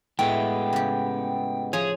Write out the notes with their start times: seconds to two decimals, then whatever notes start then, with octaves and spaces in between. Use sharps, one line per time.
0.19 A2 G#3 B3 G5
0.73 C#3 G4
1.73 F3 G#4 C#5